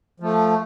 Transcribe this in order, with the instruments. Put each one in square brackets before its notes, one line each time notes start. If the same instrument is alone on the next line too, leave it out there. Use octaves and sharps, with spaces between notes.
[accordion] F3 A3